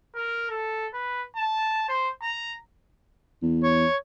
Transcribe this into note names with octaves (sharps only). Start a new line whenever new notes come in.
A#4
A4
B4
A5
C5
A#5
E2
C#5